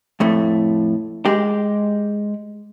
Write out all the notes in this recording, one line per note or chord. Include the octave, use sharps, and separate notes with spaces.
F2 A2 A3
G#3 G4